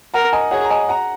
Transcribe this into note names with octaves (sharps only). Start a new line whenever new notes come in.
A#4 F#5 A#5
D#5 G#5
G#4 C#5 F#5
A#5
D#5 G#5
F#5 A#5